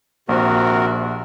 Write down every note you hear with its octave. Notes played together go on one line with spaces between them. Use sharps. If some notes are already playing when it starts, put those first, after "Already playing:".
A#1 C3 F#4 A#4 C5